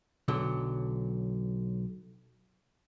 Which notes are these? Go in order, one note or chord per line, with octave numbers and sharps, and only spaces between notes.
B1 D3 F#3